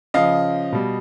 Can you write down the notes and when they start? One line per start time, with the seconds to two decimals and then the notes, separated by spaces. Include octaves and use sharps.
0.14 C#3 F3 D#5 F5
0.72 B2 G3